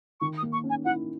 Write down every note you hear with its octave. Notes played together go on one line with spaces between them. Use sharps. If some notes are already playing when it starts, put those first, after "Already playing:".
D#3 C#6
D#6
A#3
C#6
C#4
G#5
E4 F#5